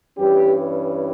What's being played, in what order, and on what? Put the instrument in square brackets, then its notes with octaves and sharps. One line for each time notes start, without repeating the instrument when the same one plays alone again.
[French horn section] G2 E3 G3 C#4 G4